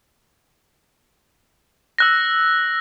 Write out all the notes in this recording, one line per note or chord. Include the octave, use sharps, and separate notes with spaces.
E6 F#6 A#6